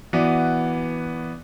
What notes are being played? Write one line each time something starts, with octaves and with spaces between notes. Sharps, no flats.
E3 B3 F#4 B4 D5